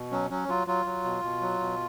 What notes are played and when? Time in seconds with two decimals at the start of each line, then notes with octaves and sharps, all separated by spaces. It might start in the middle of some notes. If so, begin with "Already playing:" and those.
Already playing: B2
0.11 F#3 C#4
0.30 F#3 C#4
0.48 F#3 F4
0.67 F#3 F4
0.85 F#3
1.04 B2
1.23 B2
1.41 F#3
1.60 B2